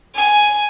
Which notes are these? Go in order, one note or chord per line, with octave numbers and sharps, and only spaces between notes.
G#5